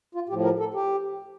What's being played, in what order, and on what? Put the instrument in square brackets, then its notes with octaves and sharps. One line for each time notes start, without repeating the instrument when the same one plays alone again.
[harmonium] F4
A2 G4
F3
A#4
A4
G4